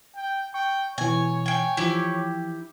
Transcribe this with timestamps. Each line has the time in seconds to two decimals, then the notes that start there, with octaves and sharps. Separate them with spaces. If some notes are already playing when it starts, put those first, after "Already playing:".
0.16 G5
0.54 G5 C#6
0.98 B2 E3 C#5 G#5
1.46 G5 G#5
1.77 E3 F3 E4 G4 D6